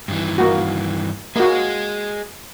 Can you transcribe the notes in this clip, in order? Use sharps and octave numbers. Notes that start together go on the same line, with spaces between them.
G2 D#3 E3
A#3 F#4
A#3 F#4 G#4 D#5